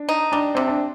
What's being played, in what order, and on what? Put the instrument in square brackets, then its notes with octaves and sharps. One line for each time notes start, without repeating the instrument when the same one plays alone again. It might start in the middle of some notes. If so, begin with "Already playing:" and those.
Already playing: [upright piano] D4
[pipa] D#4
[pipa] G3 [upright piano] D4
[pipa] C3 [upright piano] C4
[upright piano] D4